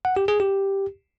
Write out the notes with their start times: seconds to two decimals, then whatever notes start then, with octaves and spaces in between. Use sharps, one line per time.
0.05 F#5
0.16 G4
0.28 G#4
0.40 G4